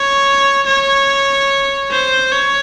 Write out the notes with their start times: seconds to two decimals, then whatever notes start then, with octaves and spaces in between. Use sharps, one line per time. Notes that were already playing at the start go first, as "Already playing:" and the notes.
Already playing: C#5
0.66 C#5
1.91 C5
2.32 C#5